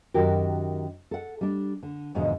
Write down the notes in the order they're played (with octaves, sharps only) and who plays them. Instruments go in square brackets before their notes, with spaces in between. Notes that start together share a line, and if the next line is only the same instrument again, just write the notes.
[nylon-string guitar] F#2 D#3 F#4 G4 A#4
A4 F#5
G3 D4
D3
E2 G#2 B2 D3 F3